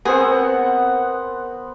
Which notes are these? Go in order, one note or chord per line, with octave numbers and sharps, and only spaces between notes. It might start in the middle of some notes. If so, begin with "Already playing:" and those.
B3 C4 G#4 A#4 C5 F#5